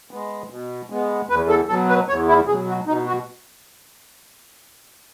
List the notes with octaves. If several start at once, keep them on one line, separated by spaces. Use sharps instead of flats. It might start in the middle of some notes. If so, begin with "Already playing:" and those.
G#3 B3
B2
G#3 B3
E2 B4
A4
B2 F#3 A4
B4
E2 C#5
E4
B2 F#3 G#4
F#4
B2 D#4
F#4